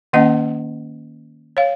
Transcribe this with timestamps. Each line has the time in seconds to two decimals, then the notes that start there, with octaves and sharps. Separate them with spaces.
0.13 D#3 A#3 C#4 D#5 F#5
1.57 C#5 F5